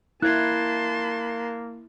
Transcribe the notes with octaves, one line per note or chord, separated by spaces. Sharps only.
A#3 E4 A5 C6 F#6 G#6